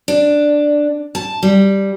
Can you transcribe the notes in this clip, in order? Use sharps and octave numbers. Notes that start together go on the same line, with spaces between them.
D4
A5
G3